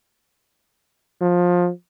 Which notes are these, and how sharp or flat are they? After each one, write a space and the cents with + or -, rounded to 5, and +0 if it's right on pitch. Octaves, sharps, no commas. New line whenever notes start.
F3 +20